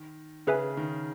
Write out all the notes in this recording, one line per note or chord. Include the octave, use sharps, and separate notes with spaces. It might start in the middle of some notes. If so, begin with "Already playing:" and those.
Already playing: D#3
C#3 G#4 B4 E5 G#5
D#3